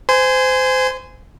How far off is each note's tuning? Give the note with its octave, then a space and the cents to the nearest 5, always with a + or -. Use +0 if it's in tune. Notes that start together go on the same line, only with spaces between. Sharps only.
C5 -25 G#5 +0 C6 -25